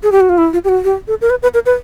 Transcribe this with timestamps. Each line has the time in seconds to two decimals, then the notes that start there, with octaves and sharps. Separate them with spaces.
0.03 G#4
0.12 G4
0.21 F#4
0.29 F4
0.38 E4
0.53 F4
0.64 G4
0.69 F#4
0.84 G4
1.08 A4
1.21 A#4
1.30 B4
1.43 B4
1.54 A#4
1.66 B4